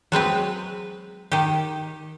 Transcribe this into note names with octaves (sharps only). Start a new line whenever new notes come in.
F#3 G#3 C4 B4
D#3 G4